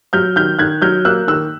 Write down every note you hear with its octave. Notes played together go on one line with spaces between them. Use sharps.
F#3 F6 G6
D#3 F6 G6
D#3 F#6 G#6
F#3 F6 G6
A#3 E6 F#6
D#3 E6 F#6